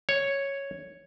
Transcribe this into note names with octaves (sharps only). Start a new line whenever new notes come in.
C#5